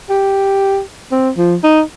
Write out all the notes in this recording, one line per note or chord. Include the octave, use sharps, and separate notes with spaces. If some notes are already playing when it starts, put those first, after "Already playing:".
G4
C4
F3
D#4